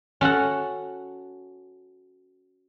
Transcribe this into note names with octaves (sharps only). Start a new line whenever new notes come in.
C#4 F#4 A4 F#5